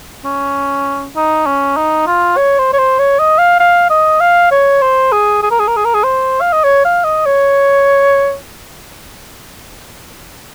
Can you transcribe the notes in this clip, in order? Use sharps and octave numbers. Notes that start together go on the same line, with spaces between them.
C#4
D#4
C#4
D#4
F4
C#5
C5
C#5
C5
C#5
D#5
F5
F5
D#5
F5
C#5
C5
G#4
G#4
A#4
G#4
A#4
G#4
A#4
G#4
C5
F5
D#5
C#5
F5
D#5
C#5